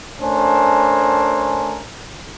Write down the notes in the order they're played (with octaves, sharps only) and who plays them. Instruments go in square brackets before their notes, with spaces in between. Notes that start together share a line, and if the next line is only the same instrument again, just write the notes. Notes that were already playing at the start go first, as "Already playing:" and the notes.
[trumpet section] A3 C#4 D4 A#4 C5 G#5